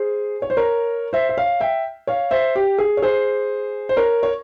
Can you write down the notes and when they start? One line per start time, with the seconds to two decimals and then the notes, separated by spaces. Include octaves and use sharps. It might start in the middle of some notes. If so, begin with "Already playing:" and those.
Already playing: G#4 C5
0.42 C#5
0.50 C5
0.57 A#4 C#5
1.13 C5 E5
1.29 E5
1.38 C#5 F5
1.61 E5 G5
2.07 C#5 F5
2.31 C5 E5
2.56 G4
2.78 G#4
2.97 C#5
3.02 G#4 C5
3.89 C5
3.97 A#4 C#5
4.23 C#5